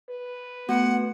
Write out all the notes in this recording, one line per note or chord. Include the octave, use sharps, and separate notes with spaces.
B4
A3 B3 F#4 F#5